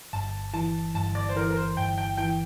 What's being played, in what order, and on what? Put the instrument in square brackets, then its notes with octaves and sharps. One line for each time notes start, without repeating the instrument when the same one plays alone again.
[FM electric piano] G1 [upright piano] A5
[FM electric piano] E3 [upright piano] A5
[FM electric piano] G1 [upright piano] A5
[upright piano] D5
C5
[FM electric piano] E3 [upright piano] A#4
[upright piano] A#4
C5
[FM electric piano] G1 [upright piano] G5
[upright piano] G5
[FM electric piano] E3 [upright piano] G5